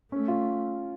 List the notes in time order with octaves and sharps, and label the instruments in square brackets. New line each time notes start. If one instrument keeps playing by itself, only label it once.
[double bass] A3 [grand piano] C#4
[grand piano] F4